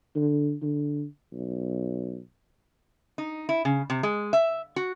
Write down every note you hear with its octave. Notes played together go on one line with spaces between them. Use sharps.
D3
D3
B1
D#4
E4
C#3
C3
G#3
E5
F#4